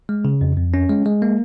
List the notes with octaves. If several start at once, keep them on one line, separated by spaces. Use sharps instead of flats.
G#3
C#3
F2
F2
C#4
G#3
G#3
A#3